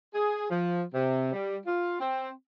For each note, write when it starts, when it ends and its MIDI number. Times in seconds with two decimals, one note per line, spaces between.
0.14 0.46 68
0.50 0.82 53
0.94 1.31 48
1.33 1.57 55
1.66 1.96 65
2.00 2.29 60